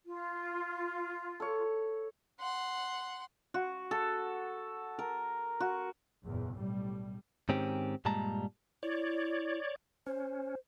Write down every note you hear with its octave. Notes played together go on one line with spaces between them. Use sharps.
F4
A4 C#5
F#5 C6
F#4
A4
A#4
F#4
F#1 E2 A#2
B1 A2 G3
G#2 D#3 C4 C#4 G4
G2 A#2 G3 G#3 A5 A#5
E4 C#5 D5
C#4 C5